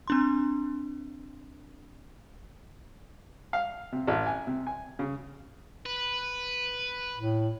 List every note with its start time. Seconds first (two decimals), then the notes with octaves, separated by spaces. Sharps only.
0.08 C4 D4 C6
3.53 F5
3.92 C3
4.07 A1
4.27 G#5
4.47 C3
4.67 G#5
4.99 C#3
5.86 B4
7.18 A2